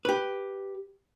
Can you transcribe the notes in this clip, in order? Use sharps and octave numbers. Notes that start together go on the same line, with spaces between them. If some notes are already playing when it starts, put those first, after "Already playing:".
G4 B4